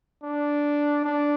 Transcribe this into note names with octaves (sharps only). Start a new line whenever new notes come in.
D4
D4